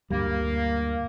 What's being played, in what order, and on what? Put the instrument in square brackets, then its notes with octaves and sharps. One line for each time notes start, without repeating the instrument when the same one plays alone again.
[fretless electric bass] D2 G2 G3 [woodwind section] A#3